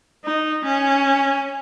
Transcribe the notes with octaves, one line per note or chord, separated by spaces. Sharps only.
D#4
C#4